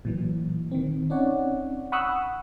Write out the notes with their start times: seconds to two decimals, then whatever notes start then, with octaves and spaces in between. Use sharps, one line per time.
0.05 A#2 E3 F#3
0.71 D#3 C4
1.10 C4 C#4 D#4 C#5 D5 F#5
1.92 F#5 B5 C#6 D#6 E6 F#6